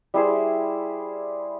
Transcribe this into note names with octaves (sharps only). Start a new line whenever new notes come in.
G3 E4 G#4 C5